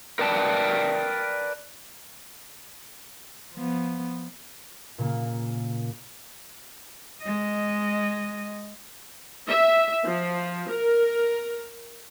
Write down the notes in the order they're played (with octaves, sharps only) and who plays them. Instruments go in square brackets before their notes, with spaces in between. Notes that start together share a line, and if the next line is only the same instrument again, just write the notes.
[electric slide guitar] A#4 B4 D5 G5 A5
[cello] F3 B3
[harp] A#2 C#3 A#3
[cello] G#3 D#5
[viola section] E5
F3
A#4